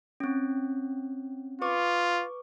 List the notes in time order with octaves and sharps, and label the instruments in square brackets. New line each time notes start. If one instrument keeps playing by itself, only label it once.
[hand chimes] C4 C#4
[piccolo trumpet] F4 [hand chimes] B4 C#6 D6